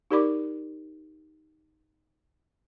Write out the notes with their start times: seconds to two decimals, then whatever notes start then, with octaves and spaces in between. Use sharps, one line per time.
0.11 D#4 G4 A#4 D5 B5 D6